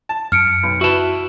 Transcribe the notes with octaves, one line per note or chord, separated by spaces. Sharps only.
A5
F#2 F6 C#7 D7
B1
E4 F#4 B4 A5